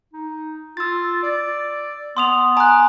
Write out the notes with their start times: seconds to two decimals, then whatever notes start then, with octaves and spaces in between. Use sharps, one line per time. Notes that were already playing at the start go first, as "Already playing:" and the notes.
0.13 D#4
0.77 F4 E6 A6
1.23 D5
2.17 B3 C6 D#6 F7
2.57 G#5 A#5 D#6 F#6